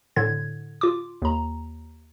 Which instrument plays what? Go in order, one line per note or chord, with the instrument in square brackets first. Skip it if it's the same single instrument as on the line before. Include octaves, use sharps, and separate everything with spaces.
[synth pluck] A2 D3 G#6
F4 D6
D#2 A#5